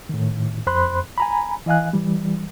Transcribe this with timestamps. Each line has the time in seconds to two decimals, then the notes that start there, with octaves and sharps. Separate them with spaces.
0.09 A2 D#3
0.67 F2 C5 B5 C6 F#6
1.18 G#5 A#5 B5
1.66 E3 D#5 F5 G#5 F#6
1.93 E3 G3